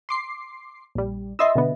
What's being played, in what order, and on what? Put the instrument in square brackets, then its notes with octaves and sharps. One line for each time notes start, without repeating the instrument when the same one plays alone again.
[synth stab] C6 D6 C7
A#1 G3
[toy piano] F4 D#5 E5 [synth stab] C6 D#6 E6
[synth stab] B2 D3 B3